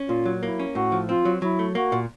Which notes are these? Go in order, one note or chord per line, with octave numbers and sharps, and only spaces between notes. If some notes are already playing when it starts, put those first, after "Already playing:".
Already playing: C#4
A#2 F4
F#3
A#3 E4
C#4
A2 F#4
F3
C4 F4
F#3
F#3 E4
A3
A#3 F#4
A#2